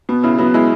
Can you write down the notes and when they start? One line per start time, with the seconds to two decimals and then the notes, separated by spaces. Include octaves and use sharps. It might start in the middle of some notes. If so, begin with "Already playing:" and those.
0.09 B2 B3
0.23 C#3 E4
0.38 F#3 B3
0.54 G#3 E4